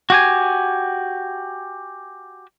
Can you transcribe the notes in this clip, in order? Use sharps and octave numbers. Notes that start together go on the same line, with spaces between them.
F#4 G4 G#5